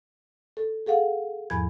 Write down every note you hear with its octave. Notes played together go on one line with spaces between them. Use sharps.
A4
G#4 A4 F5 F#5
E2 G#2 F3 B5 G#6